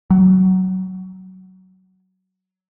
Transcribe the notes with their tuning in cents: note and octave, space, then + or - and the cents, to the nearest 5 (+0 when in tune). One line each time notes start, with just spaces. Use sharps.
F#3 +15